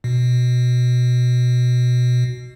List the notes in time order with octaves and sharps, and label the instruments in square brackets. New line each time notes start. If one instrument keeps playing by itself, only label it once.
[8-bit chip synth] B2